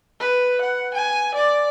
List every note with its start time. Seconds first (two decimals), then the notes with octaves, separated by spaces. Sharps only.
0.20 B4
0.61 F#5
0.95 G#5
1.34 D5